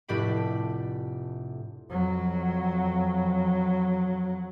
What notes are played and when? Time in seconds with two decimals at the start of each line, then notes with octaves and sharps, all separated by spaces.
0.08 F1 A2 D4 G4 B5
1.90 F2 F#3